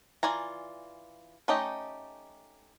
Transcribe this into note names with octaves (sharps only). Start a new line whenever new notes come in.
E3 F4 D5 G#5 A#5
A3 C#4 D#4 G4 D#5